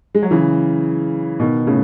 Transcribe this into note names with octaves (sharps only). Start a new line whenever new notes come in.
G#3
F#3
C#3 E3
B2 D#3
A2 C#3